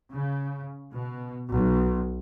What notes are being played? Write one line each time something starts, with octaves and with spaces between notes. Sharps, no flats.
C#3
B2
B1